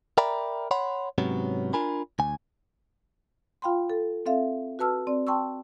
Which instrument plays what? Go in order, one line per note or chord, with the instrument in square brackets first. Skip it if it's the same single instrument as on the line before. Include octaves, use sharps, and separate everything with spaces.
[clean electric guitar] A#4 D5 E5 G5 A#5 B5
C#5 F#5 B5 C6
G#2 C3 F#3 B3 C#4
D4 F4 A#4 G#5 B5
D2 G#5
[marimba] F4 F5 G5 B5 C6
A4
C4 A4 E5 F5
F#4 B4 A5 E6 F6
C4 D5
G5 A5 C6 C#6 E6